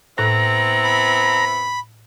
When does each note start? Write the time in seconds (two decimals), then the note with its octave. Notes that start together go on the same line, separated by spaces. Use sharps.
0.18 A2 B3 C4 E4 A#5 F#6
0.84 B5